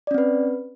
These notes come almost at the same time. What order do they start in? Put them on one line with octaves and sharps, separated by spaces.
D5 C#4 C4 B4